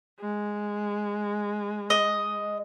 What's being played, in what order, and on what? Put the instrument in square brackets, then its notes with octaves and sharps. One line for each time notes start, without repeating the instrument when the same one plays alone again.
[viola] G#3
[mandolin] D#5